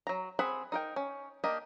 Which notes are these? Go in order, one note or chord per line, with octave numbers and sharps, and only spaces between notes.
F#3 A#5
C4 G#4 F#5 B5
D#4 A#4 G5
C#4
A#3 D4 G4 D#5